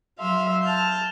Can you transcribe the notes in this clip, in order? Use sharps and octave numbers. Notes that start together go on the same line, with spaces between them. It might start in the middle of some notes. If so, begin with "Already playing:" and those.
F#3 E5 F5 C6
A5 F6 G6